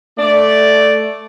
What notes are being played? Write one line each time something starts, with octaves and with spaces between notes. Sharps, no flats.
A3 D5